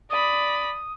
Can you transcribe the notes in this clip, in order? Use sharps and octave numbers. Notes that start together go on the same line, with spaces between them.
D5 B5 D#6